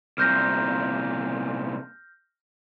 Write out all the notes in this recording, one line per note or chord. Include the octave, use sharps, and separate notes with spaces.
C2 A#2 F6 G6 A#6